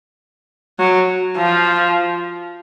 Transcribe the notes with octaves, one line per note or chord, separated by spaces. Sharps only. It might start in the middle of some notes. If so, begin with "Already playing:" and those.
F#3
F3